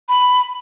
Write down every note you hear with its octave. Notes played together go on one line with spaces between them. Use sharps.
B5